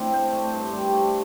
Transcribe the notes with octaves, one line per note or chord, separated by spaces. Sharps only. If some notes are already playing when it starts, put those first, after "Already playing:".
Already playing: A2 C4 D4
C5
A3
G2
G3
A3